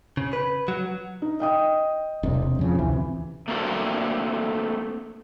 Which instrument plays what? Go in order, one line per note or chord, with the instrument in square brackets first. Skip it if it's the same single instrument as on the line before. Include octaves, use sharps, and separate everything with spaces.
[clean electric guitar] C#3
B4
F#3
[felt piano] D#4
D#5 G5 D#6
[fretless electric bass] E1 C3
F2 C#3 F3
[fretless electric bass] A1 D2 C3 [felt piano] E3
[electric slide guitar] A3 A#3 C4 D4 F#4 A4